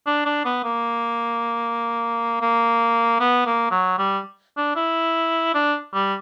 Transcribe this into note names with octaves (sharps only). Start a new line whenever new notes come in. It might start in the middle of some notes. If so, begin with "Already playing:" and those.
D4
D4
B3
A#3
A#3
B3
A#3
F#3
G3
D4
E4
D4
G3